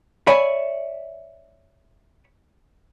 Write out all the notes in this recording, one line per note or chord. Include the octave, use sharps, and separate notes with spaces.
C#5 D5 E5 G#5 B5